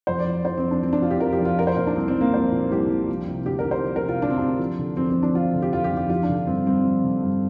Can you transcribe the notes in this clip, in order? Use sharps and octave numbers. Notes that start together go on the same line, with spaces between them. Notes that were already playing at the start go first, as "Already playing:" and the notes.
F2 C5
D5
F3
F3 C5
C4
F2
D4
F2 C4
D4
F3 F4
G4
F3 A#4
G4
F2
F4
F3 A#4
C5
A#2 A#4
D4
C2 C4
C4
C2
A#3
F3 C5
A#2
C2 G4
C2
F3
C3
D2 G4
A#4
D2
C5
F3
A#4
C3
F4
D2 D4
C4
D2 D4
F3
D3
F2 C4
C4
F2
D4
F3 F4
D3
G4
F2 F4
G4
F2
G4
F3 F4
D4
D3
G2 C4
G2 C4
F3
D3
G2